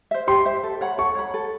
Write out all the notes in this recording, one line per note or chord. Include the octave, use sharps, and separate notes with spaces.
C5 E5
G4 C6
C5 E5
A4
C#5 F#5 B5
A4 C#6
C#5 F#5 B5
A4